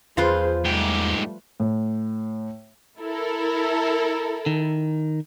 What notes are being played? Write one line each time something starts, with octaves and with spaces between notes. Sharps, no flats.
E2 F3 F4 G#4 B4 C5
G#2 G3 A3 G4
A2
E4 A4 A#4
D#3